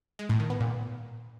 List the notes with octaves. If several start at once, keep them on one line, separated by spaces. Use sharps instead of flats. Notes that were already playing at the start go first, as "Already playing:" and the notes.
G#3
A2
D#3
B3
A#2